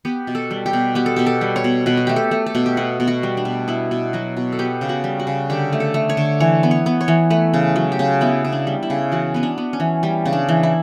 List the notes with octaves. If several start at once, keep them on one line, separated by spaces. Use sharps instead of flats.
B3 G4
B2
A4
G3
G4
B2
B3 G4
A4
B2 G4
A4
G3
C#5
B2
B2 B4
F#4
A3 G4
A4
A3
A4
B2
G4
B3 F#4
B2
F#4
G3
D4
B2
B3 E4
B2
F#3 F#4
B2
A4
B3 G4
C#3
F#4
G3
F#4
C#3
D3 G4
A3
A4
A3
C#5
D3
E3 C#5
B3
C#5
B3
C#5
E3
A3 B4
C#3
F#3
G4
C#3
B3 E4
C#3
D4
G3
E4
C#3
E3 F#4
B3 C#4
D4
B3
C#4
E3
G3 C#4
C#3
D4
E3
E4